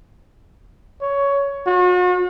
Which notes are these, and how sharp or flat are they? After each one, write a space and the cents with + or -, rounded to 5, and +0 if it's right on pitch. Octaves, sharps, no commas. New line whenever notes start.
C#5 +15
F#4 -45